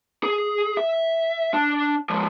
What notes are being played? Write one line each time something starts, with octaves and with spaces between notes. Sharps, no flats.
G#4
E5
D4
F3 G#3